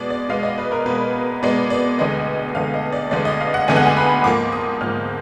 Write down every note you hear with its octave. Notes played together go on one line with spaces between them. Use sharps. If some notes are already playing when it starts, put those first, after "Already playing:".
Already playing: B2 G#3 B3 D5
D5
B2 G#3 B3 F5
D#5
B4
A#4
B2 G#3 B3 B4
B2 G#3 B3 D5
D5
D2 D3 G#3 B3 D#5
D2 D3 G#3 B3 F5
D#5
D5
D2 D3 G#3 B3 D5
D#5
F5
F#5
D2 D3 G#3 B3 G#5
F#5
G#5
B5
G#2 F3 A#3 D6
D#6
G#2 F3 A#3 F6